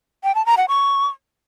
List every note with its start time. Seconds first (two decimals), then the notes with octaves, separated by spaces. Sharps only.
0.24 G5
0.35 A5
0.46 A#5
0.57 F#5
0.68 C#6